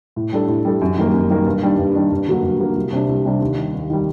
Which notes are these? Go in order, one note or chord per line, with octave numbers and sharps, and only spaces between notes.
A2
G3 D4 A4
A2
G3 D4 A4
F#2
D#3 G3 A#3
F#2
D#3 G3 A#3
G2
D#3 G3 D4
G2
D#3 G3 D4
G2
D3 F#3 A#3 F#4
G2
D3 F#3 A#3 F#4
C2
C3 G3 D4
C2
C3 G3 D4
D#2
D#3 G3
D#2
D#3 G3